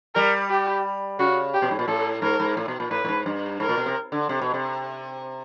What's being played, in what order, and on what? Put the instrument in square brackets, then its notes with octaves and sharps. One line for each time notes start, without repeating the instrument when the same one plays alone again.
[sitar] G3 [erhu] A#4
[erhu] G4
[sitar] C#3 [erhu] F#4
[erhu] G4
[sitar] B2
G#2
A#2
[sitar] A2 [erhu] A4
[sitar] G#2 [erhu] A#4
[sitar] G#2
A2
B2
A#2
[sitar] A2 [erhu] B4
[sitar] A2
G#2
G2
[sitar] G#2 [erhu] A#4
[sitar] A#2
B2
C3
D3
C3
B2
C3